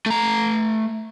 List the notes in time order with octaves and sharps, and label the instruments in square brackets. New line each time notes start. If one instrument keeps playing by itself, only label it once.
[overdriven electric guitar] A3 A#5